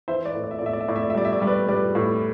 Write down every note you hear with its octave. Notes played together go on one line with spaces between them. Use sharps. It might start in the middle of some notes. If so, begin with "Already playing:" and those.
E3 C5 E5
B4 D5
A2
D5
E5
D5
A2 E5
D5
E5
A2 D5
E5
D5
E5
G3 D5
E5
D5
G3 E5
B4 D5
G3 B4 D5
A2